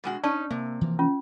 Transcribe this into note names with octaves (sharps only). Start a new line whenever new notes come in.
B2 G#3 F#4
C#4 D#4 D5 A5
C3 A#3
E3 F3 A#3
C#4 F4